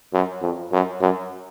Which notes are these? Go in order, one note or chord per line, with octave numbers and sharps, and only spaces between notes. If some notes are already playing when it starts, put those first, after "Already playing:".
F#2
F2
F#2
F#2